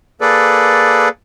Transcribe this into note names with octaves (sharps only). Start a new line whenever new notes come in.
A#3 G#4 A4 B4 D5